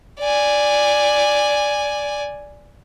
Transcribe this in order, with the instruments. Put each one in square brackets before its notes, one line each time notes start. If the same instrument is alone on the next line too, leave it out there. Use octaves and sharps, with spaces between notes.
[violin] D5 G#5